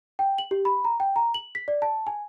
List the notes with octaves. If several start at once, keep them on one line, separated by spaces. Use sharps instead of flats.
G5
F#7
G4
B5
A#5
G5
A#5
F#7
B6
D5
A5
G#5